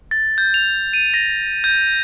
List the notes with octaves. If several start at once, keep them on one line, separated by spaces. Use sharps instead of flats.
A6
G6
F7
D#7
A#6
G6